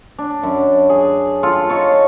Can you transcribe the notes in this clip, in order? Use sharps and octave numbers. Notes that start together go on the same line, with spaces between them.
D4
F#2
G#4
F4 A4
D#4 F4 A4 C#5